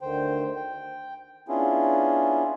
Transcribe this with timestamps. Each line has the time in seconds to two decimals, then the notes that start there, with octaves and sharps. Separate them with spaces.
0.01 D2 D3 D#3 C5 G5
0.56 G5
1.48 B3 C#4 D4 E4 F4 G#4